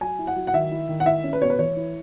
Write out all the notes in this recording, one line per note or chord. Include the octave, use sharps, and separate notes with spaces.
F#3 G#5
E4
F#5
F#3
F#5
D#3 E5
E4
D#3
F#5
E4 E5
C#4
B4
B2 C#5
B4
E3 C#5
E4